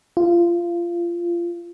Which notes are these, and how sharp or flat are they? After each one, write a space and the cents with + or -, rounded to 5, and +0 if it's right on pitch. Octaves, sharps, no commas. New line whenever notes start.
F4 -20